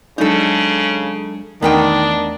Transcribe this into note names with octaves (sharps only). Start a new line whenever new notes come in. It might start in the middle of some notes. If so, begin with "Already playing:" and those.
C#3 F#3 G#3 D4 D#4 A4
E2 D#3 A3 B3 D4 D#4 G5